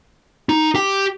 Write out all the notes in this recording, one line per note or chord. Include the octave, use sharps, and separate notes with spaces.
D#4
G4 G5